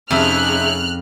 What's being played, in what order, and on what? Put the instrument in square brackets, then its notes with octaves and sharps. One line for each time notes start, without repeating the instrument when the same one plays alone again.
[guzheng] F2 [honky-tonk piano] C3 E5 [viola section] C#4 D#4 G#4 [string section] F6 F#6